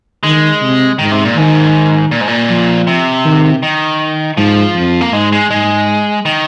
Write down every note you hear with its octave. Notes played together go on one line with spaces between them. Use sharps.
D#3 G#3
C3
G#2 D#3
C3
A#2
G#2 D#3
A#2
G#2
A#2
F3
C3
D#3
D#3
G#2 F3
F2
A#3
G#2 G#3
G#3
G#2 G#3
D#3